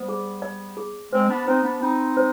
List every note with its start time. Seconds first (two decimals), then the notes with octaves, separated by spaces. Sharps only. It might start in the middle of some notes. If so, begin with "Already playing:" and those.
Already playing: G3 B3 C5
0.09 G#4
0.42 D5
0.77 G#4
1.12 G#3 C4 C5
1.29 B3 D4
1.47 C4 D#4 C5
1.64 B3 D4
1.81 C4 D#4 B5
2.17 C5